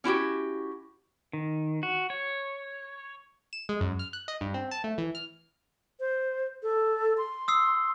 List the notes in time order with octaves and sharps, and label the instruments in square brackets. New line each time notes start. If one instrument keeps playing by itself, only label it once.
[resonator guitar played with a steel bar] C#4 E4 F#4 G4
[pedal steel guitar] D#3
F#4
C#5
[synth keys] E7
G#3
F#2
F6
F#6
D#5
G2
C4
A5
A3
E3
F6
[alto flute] C5
A4
C6
[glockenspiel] D#6 E6 C7